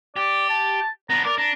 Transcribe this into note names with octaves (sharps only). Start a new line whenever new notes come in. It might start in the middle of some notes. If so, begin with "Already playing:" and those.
G4 D5
A5
B3 D4 A#5
A#4 D5
D4 A#5